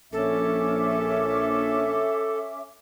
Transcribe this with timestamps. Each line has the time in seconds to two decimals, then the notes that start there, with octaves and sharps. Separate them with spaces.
0.13 A#1 C#4 A4 E5 D6